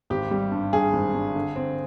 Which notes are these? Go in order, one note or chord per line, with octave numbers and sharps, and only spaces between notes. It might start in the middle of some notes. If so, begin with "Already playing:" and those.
G#1 G4
G3
G2
G2 G#4
G#1
G2
D3
C4